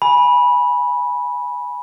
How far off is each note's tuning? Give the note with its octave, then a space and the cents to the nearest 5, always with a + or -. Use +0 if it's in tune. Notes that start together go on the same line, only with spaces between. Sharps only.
G#5 +0 B5 -15